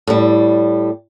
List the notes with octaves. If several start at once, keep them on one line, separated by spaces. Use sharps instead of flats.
A2 G3